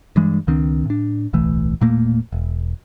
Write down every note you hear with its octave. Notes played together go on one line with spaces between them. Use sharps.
G2 E3 G#3
C#2 D#3 C4 D4
A2 D4
D1 B1 E3 A3
E1 A#2 A3 A#3
E1